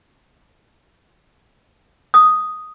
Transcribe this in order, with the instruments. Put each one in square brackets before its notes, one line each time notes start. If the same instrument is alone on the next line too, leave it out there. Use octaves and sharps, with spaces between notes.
[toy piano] D#6